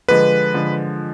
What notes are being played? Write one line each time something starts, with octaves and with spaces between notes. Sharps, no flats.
D3 F3 G#3 B4
D3 F3 G#3